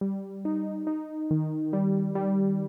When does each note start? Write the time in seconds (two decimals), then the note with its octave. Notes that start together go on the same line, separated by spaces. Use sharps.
0.01 G3
0.45 D#4
0.87 D#4
1.31 D#3
1.73 G3
2.15 G3